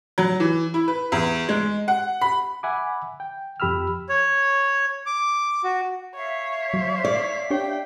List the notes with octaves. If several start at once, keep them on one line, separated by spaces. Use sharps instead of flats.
F#3
E3
E4
B4
E2
G#3
F#5
B5
E5 F#5 G#5 B5 D6
G5
F2 G4 B5 E6 F6
C#5
D6
F#4
C#5 E5 F5
F#3
D5
D4 G4 C#5 G5